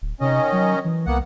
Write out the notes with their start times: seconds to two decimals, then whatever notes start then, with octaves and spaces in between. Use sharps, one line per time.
0.02 D1
0.21 C3 D#3 C#4 D#5
0.52 F#3
0.85 E3
1.07 C2 A#3 B3 F#5